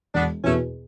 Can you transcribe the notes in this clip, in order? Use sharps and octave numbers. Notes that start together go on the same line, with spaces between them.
E1 B3 D4
E2 B2 A3 C#4